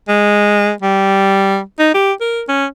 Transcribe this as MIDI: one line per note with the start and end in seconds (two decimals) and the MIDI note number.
0.08 0.72 56
0.82 1.60 55
1.79 1.92 63
1.94 2.13 67
2.21 2.42 70
2.49 2.66 61